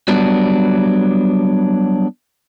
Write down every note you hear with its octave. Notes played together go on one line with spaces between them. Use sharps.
F#3 G3 B3 D4